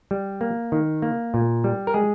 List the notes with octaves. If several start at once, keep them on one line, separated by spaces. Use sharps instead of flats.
G3
A#3
D#3
A#3
A#2
G3
A#4
G#3 G#4